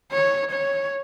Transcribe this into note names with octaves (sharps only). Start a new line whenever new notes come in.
C#5
C#5